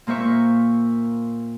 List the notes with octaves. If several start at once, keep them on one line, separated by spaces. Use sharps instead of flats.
A#2 A#3 C5 E5 C#6